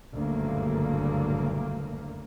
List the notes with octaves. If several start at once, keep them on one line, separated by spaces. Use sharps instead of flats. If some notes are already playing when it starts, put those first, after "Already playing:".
F#1 D2 G2 A#2 C#3 A#3